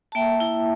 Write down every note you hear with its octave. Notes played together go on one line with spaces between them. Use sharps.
A5
A#3 E5 G5
E4